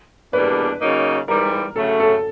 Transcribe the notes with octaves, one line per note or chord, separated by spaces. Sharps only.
E2 B2 G3 A#3 D4 B4
C#3 F#3 A#3 D#4
G#2 E3 G3 A#4
C#3 F#3 A3 A4
A4